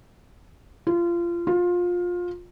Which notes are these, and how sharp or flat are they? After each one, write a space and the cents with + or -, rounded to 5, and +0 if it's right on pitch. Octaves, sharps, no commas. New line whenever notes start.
F4 -25
F4 +20